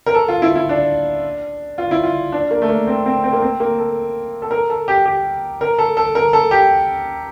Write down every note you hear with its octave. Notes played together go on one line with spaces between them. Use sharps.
A#4
A4
F4
E4
E4
D4
F4
E4
F4
D4
A#3
A3
A#3
C4
C4
C4
A#3
C4
A#3
A4
A4
A#4
A4
G4
G4
A#4
A4
A4
A#4
A4
G4